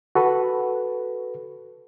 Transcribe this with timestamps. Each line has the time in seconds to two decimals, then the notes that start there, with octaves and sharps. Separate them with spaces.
0.15 F#4 A4 B4